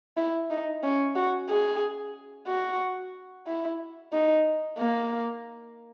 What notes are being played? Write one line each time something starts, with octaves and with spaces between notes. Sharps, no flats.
E4
D#4
C#4
F#4
G#4
F#4
E4
D#4
A#3